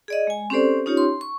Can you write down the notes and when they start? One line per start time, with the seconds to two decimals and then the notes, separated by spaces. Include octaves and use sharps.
0.08 G#4 D5 D#5
0.27 G#3 G#5
0.50 C4 C#4 G4 A4 C5 D5
0.86 C#4 D#4 F4 G4 C#5
0.97 C6
1.21 C#6